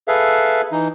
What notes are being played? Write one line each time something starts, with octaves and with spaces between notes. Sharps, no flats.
G#4 A4 B4 E5 F5
E3 D#4